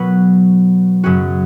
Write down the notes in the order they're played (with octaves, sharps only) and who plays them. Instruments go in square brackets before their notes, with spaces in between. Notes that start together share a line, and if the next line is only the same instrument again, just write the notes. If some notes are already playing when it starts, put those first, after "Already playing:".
Already playing: [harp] B2 F#3 B3 F#4 B4
F#2 C#3 F#3 C#4 F#4